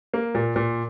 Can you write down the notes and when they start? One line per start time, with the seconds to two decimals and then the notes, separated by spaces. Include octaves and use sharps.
0.14 A#3
0.35 A#2
0.56 A#2